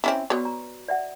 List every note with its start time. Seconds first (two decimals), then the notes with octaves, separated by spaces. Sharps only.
0.04 C4 C#4 E4
0.30 B3 F#4 B4 C#5 D5
0.45 A#5
0.88 D5 E5 F#5